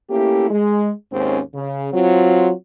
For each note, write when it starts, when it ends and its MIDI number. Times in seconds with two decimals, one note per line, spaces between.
0.10 0.49 57
0.10 0.49 58
0.10 0.49 61
0.10 0.49 64
0.10 0.49 67
0.51 0.90 56
1.12 1.40 39
1.12 1.40 44
1.12 1.40 60
1.12 1.40 61
1.55 1.88 49
1.93 2.51 54
1.93 2.51 60
1.93 2.51 65